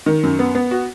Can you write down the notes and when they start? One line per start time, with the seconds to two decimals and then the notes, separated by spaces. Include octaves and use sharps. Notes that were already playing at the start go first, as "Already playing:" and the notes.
0.06 D#3
0.23 F#2
0.39 B3
0.55 B3
0.71 F#4